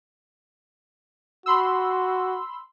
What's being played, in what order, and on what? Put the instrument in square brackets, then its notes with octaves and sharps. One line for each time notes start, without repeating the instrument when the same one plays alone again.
[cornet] F#4 [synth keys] B5 C6 E6